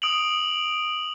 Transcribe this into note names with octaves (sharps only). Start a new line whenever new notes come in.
D#6 D7 F7 F#7